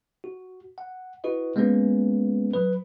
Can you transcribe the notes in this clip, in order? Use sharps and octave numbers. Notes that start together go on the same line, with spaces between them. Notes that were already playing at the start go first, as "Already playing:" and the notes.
F#4
F#5
E4 F#4 B4 D#5
G#3 A#3 B3 C#4 B4
F#3 B4